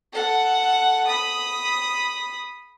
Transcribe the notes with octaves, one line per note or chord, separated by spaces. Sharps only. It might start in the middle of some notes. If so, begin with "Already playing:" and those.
A4 F#5
B5 D#6